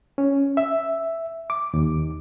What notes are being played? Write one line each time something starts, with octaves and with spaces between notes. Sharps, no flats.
C#4
E5
D6
D#2